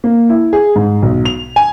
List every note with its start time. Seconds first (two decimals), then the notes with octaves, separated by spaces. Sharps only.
0.04 A#3
0.29 E4
0.53 G#4
0.76 G#2
1.02 B1
1.25 F7
1.56 G#5